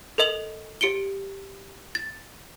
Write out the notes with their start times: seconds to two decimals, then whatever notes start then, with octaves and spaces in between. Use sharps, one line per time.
0.18 A4 A#4 D#5 F7 F#7
0.81 G4 C#7 D7 G7
1.95 A6